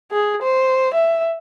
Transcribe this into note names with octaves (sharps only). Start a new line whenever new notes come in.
G#4
C5
E5